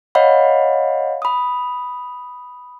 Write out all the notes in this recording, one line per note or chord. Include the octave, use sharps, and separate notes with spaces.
C#5 D#5 F5 F#5 B5
B5 D#6